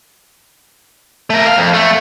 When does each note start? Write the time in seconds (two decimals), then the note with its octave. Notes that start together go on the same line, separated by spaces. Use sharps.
1.30 A3 A#4
1.46 F5
1.58 F2
1.74 A3